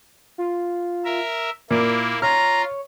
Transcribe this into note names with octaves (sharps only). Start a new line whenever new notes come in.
F4
A#4 E5
A#2 A#3 E4 D6
F4 C#5 A#5 F6